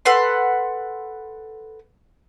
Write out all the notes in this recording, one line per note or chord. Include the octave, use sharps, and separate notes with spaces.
A4 B4 F#5 C6